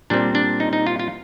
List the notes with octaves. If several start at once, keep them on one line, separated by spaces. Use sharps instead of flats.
A#2 G3 C4 D4
D4
D#4
D#4
F4
F4